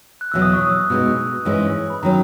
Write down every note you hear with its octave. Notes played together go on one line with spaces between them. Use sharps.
F#6
E2 B2 F#3 E6
D#6
C#6
E6
B2 G#3 D#4
G#2 E3 G#3 C#4
B5
D#3 F#3 C#4 A#5